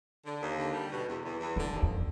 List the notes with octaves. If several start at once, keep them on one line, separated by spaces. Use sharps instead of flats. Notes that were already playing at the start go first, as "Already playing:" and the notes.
D3
D#2
D3
G3
B2
E2
E2
E2
F2 D3
D#2
F2